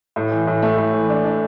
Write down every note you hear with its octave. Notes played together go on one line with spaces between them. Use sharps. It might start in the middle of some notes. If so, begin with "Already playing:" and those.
A2
E3
A2
A3
A2
E3
D4
D4